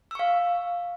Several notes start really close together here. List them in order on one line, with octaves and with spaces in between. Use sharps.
E6 C#6 F5